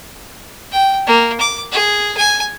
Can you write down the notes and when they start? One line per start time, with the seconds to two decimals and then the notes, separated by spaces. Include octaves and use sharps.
0.72 G5
1.07 A#3
1.40 D6
1.72 G#4
2.17 G#5